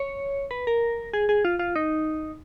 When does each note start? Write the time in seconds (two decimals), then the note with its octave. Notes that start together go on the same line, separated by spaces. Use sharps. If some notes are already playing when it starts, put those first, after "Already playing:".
Already playing: C#5
0.51 B4
0.67 A#4
1.14 G#4
1.29 G#4
1.45 F4
1.59 F4
1.76 D#4